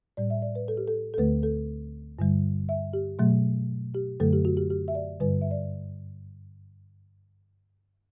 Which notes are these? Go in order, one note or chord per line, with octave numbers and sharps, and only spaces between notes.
A2 G3 D5
E5
D5
B4
A4
G4
A4
A4
D2 D3 A3 B4
A4
G2 D3 G3
E5
G4
B2 F#3 A3
G4
F#2 D3 F#3 A3 A4
G4
F#4
G4
G4
E5
D5
G2 D3 G3 B4
E5
D5